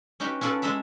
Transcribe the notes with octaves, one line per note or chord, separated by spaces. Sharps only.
C#4 D#4 F#4 G4 B4
C#4 F4 A4 B4 D5
G#3 A4 E5 A#5 B5